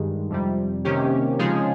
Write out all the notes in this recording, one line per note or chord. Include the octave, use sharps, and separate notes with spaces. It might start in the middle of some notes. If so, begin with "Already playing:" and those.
Already playing: G2 D#3 G#3
F2 C3 G3
C3 D#3 A#3 C#4 G4
C#3 F3 G#3 D#4 G#4